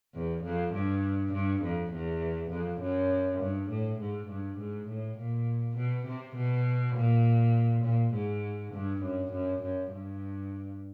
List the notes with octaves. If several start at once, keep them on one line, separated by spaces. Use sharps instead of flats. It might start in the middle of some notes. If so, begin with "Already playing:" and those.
E2
F2
G2
G2
F2
E2
F2
F#2
G2
A2
G#2
G2
G#2
A2
A#2
B2
C3
B2
A#2
A#2
G#2
G2
F#2
F#2
F#2
G2